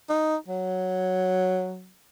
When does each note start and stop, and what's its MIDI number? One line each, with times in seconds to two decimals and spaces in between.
0.09 0.36 63
0.48 1.92 54